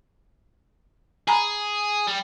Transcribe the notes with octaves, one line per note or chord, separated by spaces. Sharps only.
G#4 G#5 A#5 B5
G3